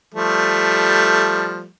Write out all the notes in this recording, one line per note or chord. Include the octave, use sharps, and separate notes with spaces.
F3 G3 A3